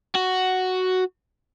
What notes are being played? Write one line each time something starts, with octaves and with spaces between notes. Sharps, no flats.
F#4